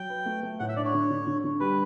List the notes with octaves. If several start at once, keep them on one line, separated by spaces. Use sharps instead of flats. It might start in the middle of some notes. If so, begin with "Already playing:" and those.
Already playing: F#3 G5
B4
A3
A3
A2 F#5
E5
D4 D5
C#5
D3
D3
D3
D3
G3 B4